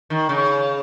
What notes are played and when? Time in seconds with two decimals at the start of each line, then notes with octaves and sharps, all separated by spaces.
0.10 D#3
0.29 C#3